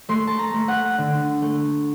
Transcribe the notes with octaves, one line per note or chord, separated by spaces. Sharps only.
A3 C6
A5
A#5
A3
F#5
D3
A3